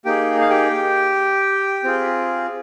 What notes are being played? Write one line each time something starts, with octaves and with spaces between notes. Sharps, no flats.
A#3 D#4 G4 G#4 G5
F5
G4 G5
C4 F4 G#4